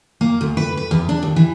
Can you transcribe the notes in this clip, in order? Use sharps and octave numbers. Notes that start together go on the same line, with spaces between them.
A#3
D2
B4
B4
E2
D4
D#2
E3